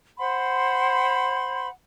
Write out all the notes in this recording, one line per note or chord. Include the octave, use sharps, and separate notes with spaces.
C5 F#5 B5 C6